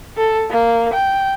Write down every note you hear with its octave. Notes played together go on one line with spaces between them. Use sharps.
A4
A#3
G5